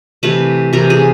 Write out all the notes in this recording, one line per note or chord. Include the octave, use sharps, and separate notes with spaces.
C3 E3 A3 B4
C3 E3 A3 A#4
G#4